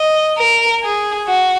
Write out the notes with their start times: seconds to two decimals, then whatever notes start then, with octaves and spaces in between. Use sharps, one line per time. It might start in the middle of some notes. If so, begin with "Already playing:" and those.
Already playing: D#5
0.38 A#4
0.83 G#4
1.28 F#4